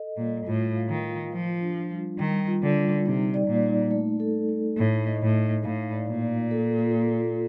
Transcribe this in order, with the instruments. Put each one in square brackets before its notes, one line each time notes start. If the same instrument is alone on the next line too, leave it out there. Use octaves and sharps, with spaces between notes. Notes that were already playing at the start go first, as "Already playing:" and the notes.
Already playing: [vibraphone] A4 D#5
[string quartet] A#2 [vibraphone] G3
[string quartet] A2 [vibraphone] F4
[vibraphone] F5
[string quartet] D#3
[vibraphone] F4
[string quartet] F3 [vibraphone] F4
[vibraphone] D4
G3
[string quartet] D#3 [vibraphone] G3
[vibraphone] F4
[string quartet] D3
[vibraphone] G3
[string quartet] C3 [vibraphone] D#4
[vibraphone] D5
[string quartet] A#2
[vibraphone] D#4
A3
A4
A3
[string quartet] A2 [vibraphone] D#4
[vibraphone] D#5
[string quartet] A2
[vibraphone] D#4
[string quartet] A2 [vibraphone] F5
[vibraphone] D5
[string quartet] A#2
[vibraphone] F4
A4
F4
A#3